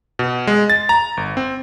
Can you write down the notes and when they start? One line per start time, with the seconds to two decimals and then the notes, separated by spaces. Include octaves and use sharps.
0.19 B2
0.47 G#3
0.70 A6
0.89 A#5
1.17 G1
1.37 C4